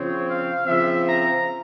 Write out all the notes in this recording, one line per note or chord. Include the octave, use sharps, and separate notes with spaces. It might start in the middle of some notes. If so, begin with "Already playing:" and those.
Already playing: C#3 F3 C4 C#5
F5
C#3 F3 C4 E5
A#5